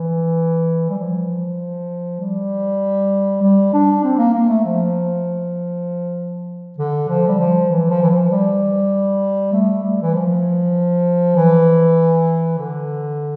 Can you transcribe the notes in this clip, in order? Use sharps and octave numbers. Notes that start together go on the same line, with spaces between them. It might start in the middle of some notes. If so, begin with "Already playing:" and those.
Already playing: E3
G3
F3
G3
G3
D4
C4
A#3
A#3
A3
F3
D3
F3
G3
F3
E3
F3
E3
F3
G3
A3
G3
E3
F3
E3
D3